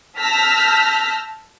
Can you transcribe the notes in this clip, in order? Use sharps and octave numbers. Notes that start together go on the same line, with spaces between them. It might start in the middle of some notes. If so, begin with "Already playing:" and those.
A5 E6 F6 G6 A#6 B6